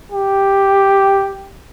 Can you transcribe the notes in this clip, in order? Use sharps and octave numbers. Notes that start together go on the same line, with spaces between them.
G4